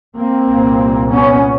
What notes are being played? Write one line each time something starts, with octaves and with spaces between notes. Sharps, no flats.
A#3 C4
C2 A#2
B3 C#4